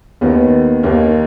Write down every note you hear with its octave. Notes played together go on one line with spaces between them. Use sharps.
D#2 D#3 B3
D#2 D#3 A#3